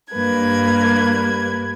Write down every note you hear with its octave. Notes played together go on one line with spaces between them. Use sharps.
G2 A#3 B4 G#6